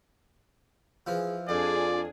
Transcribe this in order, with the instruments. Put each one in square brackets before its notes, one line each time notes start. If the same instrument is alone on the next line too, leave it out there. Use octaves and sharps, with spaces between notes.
[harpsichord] E3 F3 [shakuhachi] G#4
[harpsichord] F2 [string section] D4 G#4 [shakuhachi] F4 [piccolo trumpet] D5